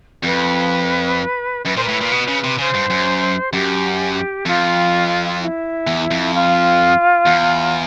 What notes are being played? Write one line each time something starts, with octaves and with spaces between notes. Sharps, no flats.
F2 B4
F#2 B4
A#2 C5
A2 B4
A#2
B2
C#3
C3
C#3 C5
G2
F#2
F#2 G4
F2 F4
E4
E2
F2
F4
E2